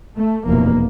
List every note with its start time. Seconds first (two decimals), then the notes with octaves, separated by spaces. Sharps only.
0.16 A3
0.45 F1 E2 B2 A#3